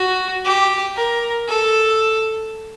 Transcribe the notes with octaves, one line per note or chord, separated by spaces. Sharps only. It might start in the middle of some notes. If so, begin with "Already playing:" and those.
Already playing: F#4
G4
A#4
A4